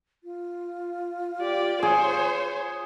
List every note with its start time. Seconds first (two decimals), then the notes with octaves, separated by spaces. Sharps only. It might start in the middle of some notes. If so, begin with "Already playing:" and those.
0.24 F4
1.41 G4 D5
1.83 G#4 C5 C#5